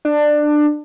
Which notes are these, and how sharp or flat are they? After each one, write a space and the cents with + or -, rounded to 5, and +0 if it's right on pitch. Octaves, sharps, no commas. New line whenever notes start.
D4 +20